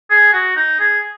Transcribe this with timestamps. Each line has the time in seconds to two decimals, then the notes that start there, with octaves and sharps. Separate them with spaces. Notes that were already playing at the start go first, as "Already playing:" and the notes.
0.10 G#4
0.32 F#4
0.56 D#4
0.80 G#4